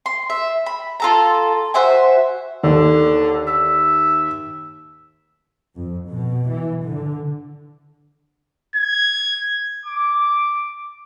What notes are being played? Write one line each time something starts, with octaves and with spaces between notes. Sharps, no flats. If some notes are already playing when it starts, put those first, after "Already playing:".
C6
E5
B5
F4 A4 A#5
F#4 C5 E5 G#5
D#2 D3
E5
F2
B2
E3
D3
G#6
D6